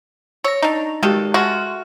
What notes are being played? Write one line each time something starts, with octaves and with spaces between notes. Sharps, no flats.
C#5 E6 A#6
D4 D#4 C#6 F7
D#3 G#3 G4 A4
G#3 A3 F#4 C6 F6